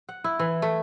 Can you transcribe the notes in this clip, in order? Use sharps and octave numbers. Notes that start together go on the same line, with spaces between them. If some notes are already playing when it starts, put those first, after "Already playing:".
F#5
E4
E3
A3